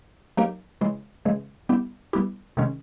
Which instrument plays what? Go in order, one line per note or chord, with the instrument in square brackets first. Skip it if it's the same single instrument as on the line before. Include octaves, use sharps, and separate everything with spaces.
[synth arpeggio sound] F#3 A#3 D#4 G4 A#4
C#3 E3 G#3
C#3 E3 G#3
G3 B3 E4 G4
G3 B3 E4 G4
C3 D#3 G#3 C#4